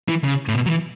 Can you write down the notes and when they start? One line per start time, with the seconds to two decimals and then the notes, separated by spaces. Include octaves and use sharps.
0.08 E3
0.24 C#3
0.48 A2
0.54 B2
0.66 F#3
0.70 E3